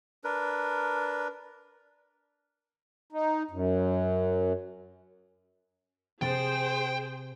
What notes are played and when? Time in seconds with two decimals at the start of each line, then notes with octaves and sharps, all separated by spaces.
0.24 D4 A#4 B4
3.13 D#4
3.51 F#2
6.22 C3 G#4 C5 G5 A6